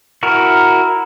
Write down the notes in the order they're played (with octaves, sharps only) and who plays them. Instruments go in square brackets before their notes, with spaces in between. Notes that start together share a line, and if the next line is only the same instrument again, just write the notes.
[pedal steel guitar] E4 F#4 A#4